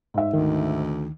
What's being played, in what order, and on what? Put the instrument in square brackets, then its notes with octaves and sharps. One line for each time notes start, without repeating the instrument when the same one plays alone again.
[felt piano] G#2 E5
[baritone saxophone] D2 [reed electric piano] D#3